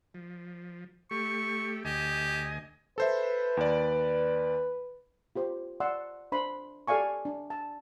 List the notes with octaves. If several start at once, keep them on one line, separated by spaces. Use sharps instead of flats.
F3
A3 G4 C#6
D2 G4 D#5 G#5
A4 B4 C5 E5
D#2 D5
F4 G4 C5
D5 F#5 C6 E6
D4 C5 B5 C6
G4 A4 D5 F5 G#5 C#6
D4
A5